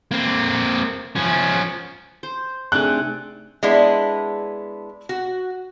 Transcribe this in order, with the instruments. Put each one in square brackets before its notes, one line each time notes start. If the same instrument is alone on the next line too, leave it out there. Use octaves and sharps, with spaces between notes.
[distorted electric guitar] A#3 C4
F3 C#4
[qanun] C5
[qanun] C3 D4 G#5 [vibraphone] A3 D#4 G#4 [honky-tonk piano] F#6
[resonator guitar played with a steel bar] G#3 B3 D4 E4
F#4